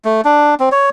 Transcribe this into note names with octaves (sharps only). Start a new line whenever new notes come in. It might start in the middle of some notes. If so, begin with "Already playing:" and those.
A3
D4
C4
C#5